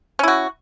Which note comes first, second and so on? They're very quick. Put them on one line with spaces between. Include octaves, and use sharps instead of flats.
C#4 E4 F#4